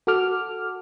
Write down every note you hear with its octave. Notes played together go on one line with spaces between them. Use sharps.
F#4 A4 D6 F6